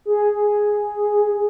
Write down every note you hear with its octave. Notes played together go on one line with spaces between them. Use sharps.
G#4